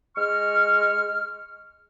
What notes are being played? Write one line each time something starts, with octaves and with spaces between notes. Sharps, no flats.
G#3 C#6 F6